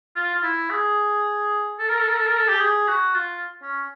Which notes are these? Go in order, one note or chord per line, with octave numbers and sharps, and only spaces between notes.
F4
F4
E4
G#4
A4
A#4
A4
A#4
A4
A#4
A4
G4
G#4
F#4
F4
C#4